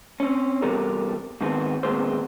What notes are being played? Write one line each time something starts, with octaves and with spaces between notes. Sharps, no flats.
C4 C#4
C3 E3 G3 B3 A4 A#4
G#2 D#3 B3 C4
A#2 D#3 G#3 B3 C4 C5